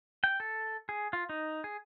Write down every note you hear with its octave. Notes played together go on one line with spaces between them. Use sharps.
G5
A4
G#4
F4
D#4
G#4